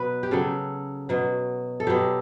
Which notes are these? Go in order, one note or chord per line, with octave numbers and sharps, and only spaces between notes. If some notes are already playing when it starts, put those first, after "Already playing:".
Already playing: B2 F#3 B4
G4
C#3 F#3 A4
B2 F#3
A4
B2 F#3 G4